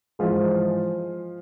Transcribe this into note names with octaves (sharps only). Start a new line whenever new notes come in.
G#2 E3 F3 G#3 F4